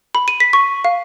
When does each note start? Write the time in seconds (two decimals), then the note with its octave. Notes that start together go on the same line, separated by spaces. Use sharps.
0.15 B5
0.28 D#7
0.40 B6
0.53 C#6
0.85 F5